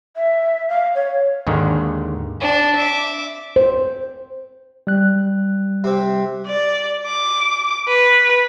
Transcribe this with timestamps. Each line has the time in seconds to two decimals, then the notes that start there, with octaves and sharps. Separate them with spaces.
0.16 E5
0.69 F5
0.95 C#5
1.47 D#2 G#2 D3 D#3
2.40 D4
2.75 E5 D6
3.56 C5
4.87 G3 F#6
5.84 C3 C4
6.46 D5
7.06 D6
7.88 B4